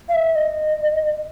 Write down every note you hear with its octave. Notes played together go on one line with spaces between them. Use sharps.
F5
E5
D#5